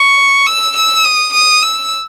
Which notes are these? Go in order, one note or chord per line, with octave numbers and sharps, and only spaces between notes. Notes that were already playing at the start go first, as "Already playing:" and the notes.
Already playing: C#6
E6
E6
D#6
D#6
E6